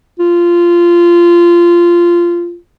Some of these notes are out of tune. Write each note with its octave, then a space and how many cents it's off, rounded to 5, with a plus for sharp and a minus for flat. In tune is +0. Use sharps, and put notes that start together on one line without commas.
F4 -15